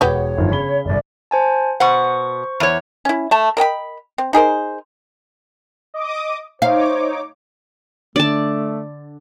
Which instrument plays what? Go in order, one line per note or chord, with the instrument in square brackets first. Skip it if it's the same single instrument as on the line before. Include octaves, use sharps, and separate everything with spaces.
[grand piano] E1 [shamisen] B3 F#4 G4 [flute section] C#5
[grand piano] G1 D#3 F3
C#3 B5 G7
[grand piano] G1 C2 [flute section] D5
[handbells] C5 G#5 A5
[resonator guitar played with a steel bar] B2 F#5 [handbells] C5 C#6
[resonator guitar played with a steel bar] E2 C#5
[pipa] C#4 E4
A3 A5
A#4 D#5 G5 B5
C4
D#4 G#4 A#4 C5
[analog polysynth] D#5 D6 D#6
[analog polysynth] D#4 C#5 D6 [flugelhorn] C5 [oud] F5
[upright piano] D3 [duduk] A3 [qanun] D5 A5